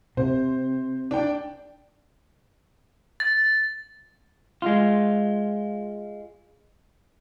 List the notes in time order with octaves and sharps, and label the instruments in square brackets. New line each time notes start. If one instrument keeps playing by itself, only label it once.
[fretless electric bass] C3 [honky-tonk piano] C5
[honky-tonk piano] D4 G5
[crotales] A6
[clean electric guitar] G#3 F4